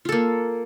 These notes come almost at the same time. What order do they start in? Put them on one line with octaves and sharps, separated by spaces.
F4 A4 A#3